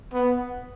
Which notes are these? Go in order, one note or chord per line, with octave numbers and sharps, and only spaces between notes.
B3